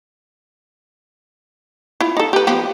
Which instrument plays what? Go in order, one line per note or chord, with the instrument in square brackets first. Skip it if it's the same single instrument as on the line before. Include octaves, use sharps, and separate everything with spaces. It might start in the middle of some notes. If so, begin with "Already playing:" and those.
[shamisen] E4 F4
D#4 A4
G4 B4
F3 B3 G4